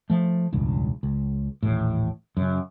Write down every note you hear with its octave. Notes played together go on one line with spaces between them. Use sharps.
F3 A3
E1 C#2 G2
C#2
D#1 A1 A2
F#2 C#3